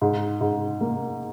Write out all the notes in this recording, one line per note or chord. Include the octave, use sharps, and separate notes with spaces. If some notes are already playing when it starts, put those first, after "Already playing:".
G#2
G#2
A#3